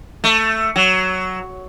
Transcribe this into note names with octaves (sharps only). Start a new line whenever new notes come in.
A3
F#3